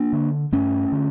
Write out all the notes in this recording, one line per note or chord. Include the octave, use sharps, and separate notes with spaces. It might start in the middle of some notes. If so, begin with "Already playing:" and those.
Already playing: A#3 D4
D3
G2 A3 C#4
D3